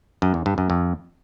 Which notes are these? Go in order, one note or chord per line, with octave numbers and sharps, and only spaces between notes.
F#2
E2
G2
F#2
F2